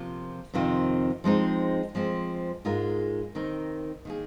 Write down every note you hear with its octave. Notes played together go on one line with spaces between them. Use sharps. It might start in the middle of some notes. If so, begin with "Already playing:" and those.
Already playing: C3 F3 A#3 F4
F2 C3 D#3 C4 F4
F3 G#3 C4 D#4
F3 G#3 C4
G#2 G#3 F4 A#4
D#3 C4 D#4 A#4
D#3 A#3 G#4